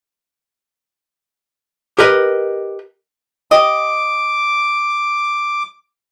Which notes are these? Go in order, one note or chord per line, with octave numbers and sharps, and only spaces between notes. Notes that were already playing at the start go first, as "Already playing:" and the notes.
G4 A#4 B4 D#5
G4 D#5 D6